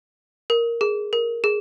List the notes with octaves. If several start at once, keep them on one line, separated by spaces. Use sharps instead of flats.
A#4
G#4
A#4
G#4